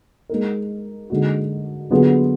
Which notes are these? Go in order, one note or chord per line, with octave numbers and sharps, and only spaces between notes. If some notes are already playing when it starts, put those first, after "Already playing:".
G#3 D#4 A#4
D3 G#3 D#4 F#4
D3 F#3 B3 F4 G#4